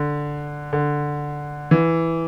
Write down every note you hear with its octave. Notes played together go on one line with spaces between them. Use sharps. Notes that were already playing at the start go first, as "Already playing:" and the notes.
Already playing: D3
D3
E3